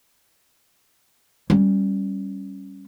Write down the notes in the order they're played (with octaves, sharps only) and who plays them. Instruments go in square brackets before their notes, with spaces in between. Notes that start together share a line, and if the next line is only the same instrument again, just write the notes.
[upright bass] G3 C#4